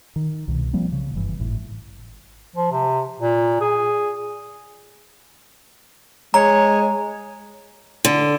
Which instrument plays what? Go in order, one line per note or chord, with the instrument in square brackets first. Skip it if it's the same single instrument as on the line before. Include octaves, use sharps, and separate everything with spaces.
[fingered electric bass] D#3
C2 B2
F3 G3 A#3 C4
C#3
F#1 G2 E3
G#1 A2
[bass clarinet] F3
C3
A#2
G#4
[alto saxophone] G#3 [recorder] C#5 [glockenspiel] A#5
[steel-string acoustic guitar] D3